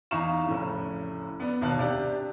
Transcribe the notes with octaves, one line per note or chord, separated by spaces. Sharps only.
E2 D#4 F5 A#5 C#6 E7
F1 A2 C#3
B3 D4
D#2 B2 F5 A5 F#6
C3 D4 G4